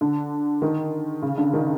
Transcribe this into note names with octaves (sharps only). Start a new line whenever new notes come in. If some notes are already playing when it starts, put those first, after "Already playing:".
D3
D#3
C#3
D3
D#3